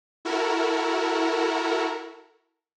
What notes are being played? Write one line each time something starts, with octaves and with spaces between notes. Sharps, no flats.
E4 F#4 A4 A#4